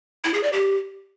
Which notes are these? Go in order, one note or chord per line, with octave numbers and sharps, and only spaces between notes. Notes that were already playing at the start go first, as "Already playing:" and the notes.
E4
G#4
D5
G4